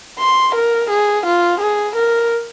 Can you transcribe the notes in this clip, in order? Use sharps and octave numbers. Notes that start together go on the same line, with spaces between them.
C6
A#4
G#4
F4
G#4
A#4